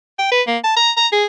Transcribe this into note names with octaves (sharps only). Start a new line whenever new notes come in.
G5
B4
A#3
A5
A#5
A#5
G#4